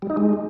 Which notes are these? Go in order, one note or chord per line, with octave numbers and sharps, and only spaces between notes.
G3
D#4
G#3